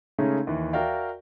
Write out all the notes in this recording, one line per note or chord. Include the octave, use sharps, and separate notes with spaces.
C#3 G#3 A3 C#4 D#4
D#2 E3
F#4 A#4 D5 E5 F5 G5